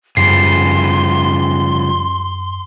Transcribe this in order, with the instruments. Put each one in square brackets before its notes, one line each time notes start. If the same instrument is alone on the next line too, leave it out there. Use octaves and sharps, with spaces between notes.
[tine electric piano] F#2 [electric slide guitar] C#3 F3 G3 [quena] C6 [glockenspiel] C7